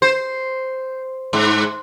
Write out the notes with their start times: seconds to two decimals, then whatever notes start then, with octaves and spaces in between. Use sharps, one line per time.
0.02 C5
1.33 G#2